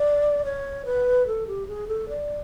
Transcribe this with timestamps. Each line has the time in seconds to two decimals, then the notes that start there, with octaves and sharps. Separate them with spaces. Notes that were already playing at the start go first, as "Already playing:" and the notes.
Already playing: D5
0.45 C#5
0.85 B4
1.27 A4
1.48 G4
1.68 G#4
1.88 A4
2.09 D5